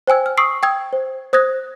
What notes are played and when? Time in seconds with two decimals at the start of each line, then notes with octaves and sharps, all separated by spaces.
0.07 C5 G5 G#5 E6 G#6
0.26 F6
0.37 C#6 D#6 E6 C7 D7
0.63 G5 D#6 E6 G#6
0.93 C5
1.33 C5 D#6 F#6 G#6 A#6